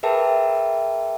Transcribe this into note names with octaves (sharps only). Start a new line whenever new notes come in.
G#4 A#4 B4 E5 G5 A5